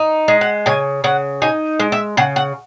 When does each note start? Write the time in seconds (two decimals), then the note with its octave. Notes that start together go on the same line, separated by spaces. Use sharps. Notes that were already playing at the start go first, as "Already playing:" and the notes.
Already playing: D#4
0.28 G#3
0.41 F#5
0.66 C#3 G#5
1.04 C#3 F#5
1.42 D#4 G#5
1.80 G#3
1.92 E5
2.17 C#3 F#5
2.36 F#5